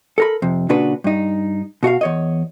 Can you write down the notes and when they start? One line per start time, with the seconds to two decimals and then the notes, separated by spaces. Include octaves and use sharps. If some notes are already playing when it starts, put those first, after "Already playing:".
0.18 A4 A#4 B5
0.42 F2 C3
0.69 A#2 C#3 D4 F#4 B4
1.04 G2 D#4
1.83 B2 F#4 E5 F5
2.01 E2 C#5 D#5